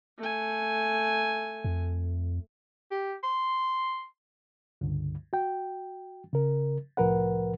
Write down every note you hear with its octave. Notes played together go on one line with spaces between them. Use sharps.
A3 G#5
F2
G4
C6
C#2 G2 D3
F#4 G5
C#3 A#4
C2 A2 F3 A#4 B4 F#5